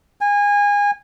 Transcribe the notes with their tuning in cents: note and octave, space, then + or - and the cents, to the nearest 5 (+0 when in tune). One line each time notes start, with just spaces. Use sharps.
G#5 -25